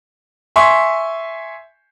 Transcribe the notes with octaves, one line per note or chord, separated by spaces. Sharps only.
E5 G#5 C6 C#6